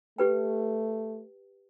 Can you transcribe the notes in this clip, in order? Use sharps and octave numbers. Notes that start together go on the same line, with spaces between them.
A3 G4 B4 G5